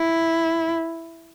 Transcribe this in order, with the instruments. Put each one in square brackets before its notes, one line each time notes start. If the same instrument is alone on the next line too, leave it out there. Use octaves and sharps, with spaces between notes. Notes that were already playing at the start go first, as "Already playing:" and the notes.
Already playing: [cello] E4